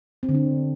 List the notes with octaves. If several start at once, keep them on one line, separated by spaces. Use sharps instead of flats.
C4
D3
D4